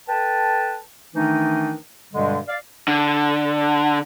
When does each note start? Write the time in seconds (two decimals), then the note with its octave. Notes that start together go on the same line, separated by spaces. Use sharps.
0.08 A4 B4 G5 A5
1.15 D#3 E3 A3 D4 D#4
2.14 G2 B2 D3 G3 G#3
2.48 D5 F5
2.88 D3